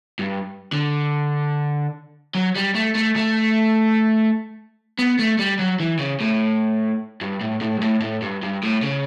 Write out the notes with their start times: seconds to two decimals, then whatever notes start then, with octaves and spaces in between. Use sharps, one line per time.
0.19 G2
0.72 D3
2.35 F#3
2.56 G3
2.75 A3
2.95 A3
3.16 A3
4.98 B3
5.19 A3
5.39 G3
5.59 F#3
5.80 E3
5.99 C#3
6.20 A2
7.21 G2
7.41 A2
7.61 A2
7.77 G2
7.81 A2
8.02 A2
8.22 G2
8.42 G2
8.63 A2
8.83 C#3